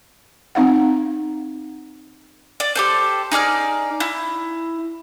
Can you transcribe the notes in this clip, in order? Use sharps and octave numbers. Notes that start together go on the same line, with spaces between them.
C4 D#4 F5 F#5
D5
G4 A4 C5
D#4 G#4 D5 F6
E4